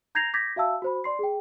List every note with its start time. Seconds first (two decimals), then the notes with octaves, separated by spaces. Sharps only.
0.15 A#5 G6 G#6 A#6 C7 F7
0.34 D6 G6 G#6 A#6 B6
0.56 F#4 E5 F5 A5 E6
0.82 F#4 C5 B5
1.04 D5 C6 C7
1.19 G#4 G5